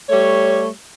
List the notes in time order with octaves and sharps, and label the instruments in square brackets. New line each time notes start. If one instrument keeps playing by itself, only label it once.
[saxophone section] G3 A3 C#5